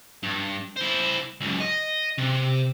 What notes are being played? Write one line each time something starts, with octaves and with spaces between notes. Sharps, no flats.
G2
E4 C5
C#2 F#2
D#5
C3